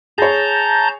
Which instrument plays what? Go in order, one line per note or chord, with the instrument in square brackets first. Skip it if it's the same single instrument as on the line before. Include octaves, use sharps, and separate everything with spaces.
[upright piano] G#4 C#5 [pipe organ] A5 A#5 G6